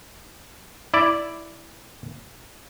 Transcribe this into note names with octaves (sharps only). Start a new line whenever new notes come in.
E4 D5